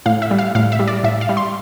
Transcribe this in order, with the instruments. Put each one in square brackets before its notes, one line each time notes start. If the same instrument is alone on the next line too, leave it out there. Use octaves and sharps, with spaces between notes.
[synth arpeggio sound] A2 F5
E5
G3
F5
A2 F5
E5
G3
D5
A2 E5
F5
G3
C6